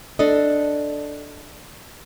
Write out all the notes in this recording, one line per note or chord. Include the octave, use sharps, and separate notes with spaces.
D4 A4 D#5